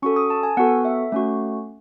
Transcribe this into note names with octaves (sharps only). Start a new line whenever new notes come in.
C#4 F#4 A4 C#6
D#6
A5
G#5
B3 F#4 A4 F#5
E5
A3 C#4 F#4